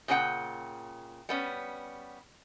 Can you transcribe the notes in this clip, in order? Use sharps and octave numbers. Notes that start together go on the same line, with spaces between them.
A#2 C#3 C#4 D4 F#5 G5
G3 B3 C#4